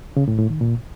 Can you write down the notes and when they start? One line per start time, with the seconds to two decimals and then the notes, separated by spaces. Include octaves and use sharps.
0.17 C#3
0.28 A2
0.39 A2
0.50 D#3
0.61 A#2